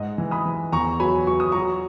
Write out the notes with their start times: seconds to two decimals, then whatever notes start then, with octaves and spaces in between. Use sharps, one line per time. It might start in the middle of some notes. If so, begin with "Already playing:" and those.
Already playing: G#2 D#5 F#5
0.18 E3
0.31 B5 D#6
0.45 E3
0.72 E2 A#5 C#6
1.00 F#3 G#5 B5
1.27 F#3 C#6
1.40 D#6
1.52 F#3 A#5 C#6